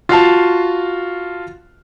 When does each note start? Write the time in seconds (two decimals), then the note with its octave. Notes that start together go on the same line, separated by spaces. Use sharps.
0.09 F4 F#4 F5 A5